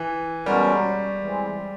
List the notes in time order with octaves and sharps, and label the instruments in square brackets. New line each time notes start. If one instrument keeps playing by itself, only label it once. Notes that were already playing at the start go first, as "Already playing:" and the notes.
Already playing: [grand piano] E3
[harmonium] B2 G#3 C#4 F#4 A#4 [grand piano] G3
[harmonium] E3 G#3 C4